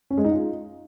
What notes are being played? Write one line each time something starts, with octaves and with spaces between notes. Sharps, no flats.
C#4
G#3
D#4
F4